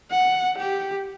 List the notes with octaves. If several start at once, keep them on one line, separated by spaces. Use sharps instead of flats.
F#5
G4